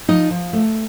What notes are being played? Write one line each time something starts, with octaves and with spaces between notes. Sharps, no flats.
F3 D#4 D#5
F3
A3